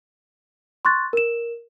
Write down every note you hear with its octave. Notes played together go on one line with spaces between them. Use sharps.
C6 C#6 F#6 A6
A#4 E7